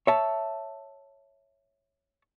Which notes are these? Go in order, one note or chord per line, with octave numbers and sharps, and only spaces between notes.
C#5 E5 A5